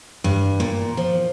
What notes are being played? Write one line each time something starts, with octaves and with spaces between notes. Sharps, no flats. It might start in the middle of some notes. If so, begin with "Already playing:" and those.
G2
A#2
F3